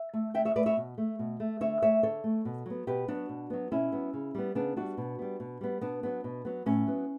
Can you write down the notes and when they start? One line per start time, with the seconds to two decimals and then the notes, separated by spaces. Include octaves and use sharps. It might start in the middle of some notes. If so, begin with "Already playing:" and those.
Already playing: E5
0.14 A3
0.34 D3 E5 G5
0.45 C#5 E5
0.55 A3 B4 D5
0.66 C#5 E5
0.77 B2
0.98 A3
1.19 B2
1.40 A3
1.61 D3 C#5 E5
1.82 A3 C#5 E5
2.03 D3 A4 C#5
2.24 A3
2.45 B2
2.66 F#3 B3
2.87 B2 G4 B4
3.08 F#3 B3 D4 F#4
3.29 B2
3.50 F#3 B3
3.71 B2 C#4 E4
3.92 F#3 B3
4.13 C#3
4.35 G3 B3
4.55 C#3 B3 D4
4.77 G3 B3 D4 F#4
4.97 B2
5.19 G3 B3
5.40 B2
5.61 G3 B3
5.81 B2 B3 D4
6.03 F#3 B3
6.24 B2
6.45 F#3 B3
6.66 A2 C#4
6.87 F#3 B3